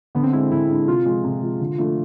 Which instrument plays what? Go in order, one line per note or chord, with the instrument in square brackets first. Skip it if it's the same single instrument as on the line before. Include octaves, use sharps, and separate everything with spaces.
[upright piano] D3 [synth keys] B3
[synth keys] C4
[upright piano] G#3 [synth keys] E4
[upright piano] D4
[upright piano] D3 [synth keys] E4
[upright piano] G#3 D4
[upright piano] C3 [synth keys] F4
[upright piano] F3 G#3
C3
F3 G#3
D3
F3 A3 D4 F4